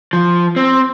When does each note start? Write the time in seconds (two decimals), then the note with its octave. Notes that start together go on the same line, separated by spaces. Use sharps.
0.13 F3
0.56 C4